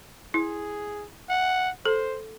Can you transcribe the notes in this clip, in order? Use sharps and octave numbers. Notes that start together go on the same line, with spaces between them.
E4 G#4
F#5
A4 C5